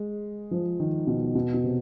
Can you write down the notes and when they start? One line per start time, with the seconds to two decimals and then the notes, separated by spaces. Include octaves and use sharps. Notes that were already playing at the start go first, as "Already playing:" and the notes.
Already playing: G#3
0.51 F3
0.80 D#3
1.07 B2
1.35 B2
1.54 B2
1.64 C3